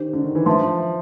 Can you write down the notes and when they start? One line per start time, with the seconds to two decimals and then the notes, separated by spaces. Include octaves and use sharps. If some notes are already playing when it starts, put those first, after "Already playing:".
Already playing: D#3 D4 G4 C5
0.13 D3
0.24 D#3
0.35 E3
0.46 F3 C5 E5 A5 C6